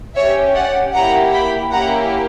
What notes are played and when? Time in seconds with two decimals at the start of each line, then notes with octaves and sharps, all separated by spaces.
0.16 C#4 G4 C#5 E5
0.55 D5 F#5
0.95 A#3 E4 G4 F#5 A#5
1.33 G5 B5
1.73 A#3 C#4 E4 G4 F#5 A#5